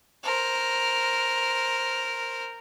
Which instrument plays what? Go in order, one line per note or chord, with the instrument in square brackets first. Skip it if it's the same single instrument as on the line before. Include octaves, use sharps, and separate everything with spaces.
[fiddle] A#4 C5